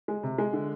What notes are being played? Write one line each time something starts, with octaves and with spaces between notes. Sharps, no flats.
G#3
C3
G#3
D3